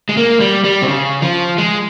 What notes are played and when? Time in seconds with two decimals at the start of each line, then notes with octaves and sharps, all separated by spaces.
0.09 G#3
0.17 A#3
0.41 G3
0.64 G3
0.82 C3
0.88 C#3
1.22 F3
1.58 G#3